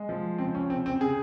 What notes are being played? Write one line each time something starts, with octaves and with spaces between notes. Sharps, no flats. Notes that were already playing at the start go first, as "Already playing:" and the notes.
Already playing: G#3
F3
C#3 C4
C#4
C#3 C4
C4
C#3 G#4